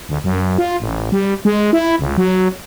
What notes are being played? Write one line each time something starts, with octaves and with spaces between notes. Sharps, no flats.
D2
F#2
F4
A1
G3
G#3
E4
C#2
F#3